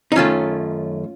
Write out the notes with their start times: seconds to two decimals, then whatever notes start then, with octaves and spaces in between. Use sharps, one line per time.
0.12 D#4
0.15 F#2 D#3 A3 C#4 F4